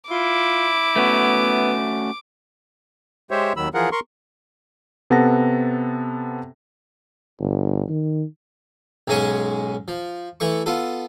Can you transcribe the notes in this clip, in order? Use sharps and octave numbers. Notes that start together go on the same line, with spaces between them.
E4 F4 D6
A3 B3 C#4 F#4
G#3 G4 C5 C#5 E5
D#2 D#3 F#3 B5 E6
E3 F3 F4 G#4 A#4 F#5
A#4 C6 C#6
C3 B3 A4 F#5 A5 A#6
G1
D#3
B1 G#2 G#3 C#4 G#5 C#6
F3
E3 A3 C#6
B3 F4 A4